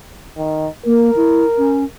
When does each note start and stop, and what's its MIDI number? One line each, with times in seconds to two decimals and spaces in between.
0.37 0.67 51
0.86 1.11 58
0.86 1.89 70
1.16 1.46 64
1.58 1.84 61